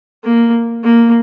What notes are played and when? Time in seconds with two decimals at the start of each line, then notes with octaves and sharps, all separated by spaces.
0.24 A#3
0.84 A#3